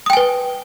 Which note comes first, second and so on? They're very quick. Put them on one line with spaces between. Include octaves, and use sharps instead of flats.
D#6 G5 G#5 B4